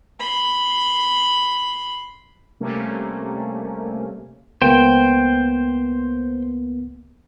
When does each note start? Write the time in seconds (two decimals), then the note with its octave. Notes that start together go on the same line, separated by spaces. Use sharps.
0.20 B5 C6
2.60 C3 G3 A3 A#3 C#4
4.62 C#2 A#3 B3 C5 G5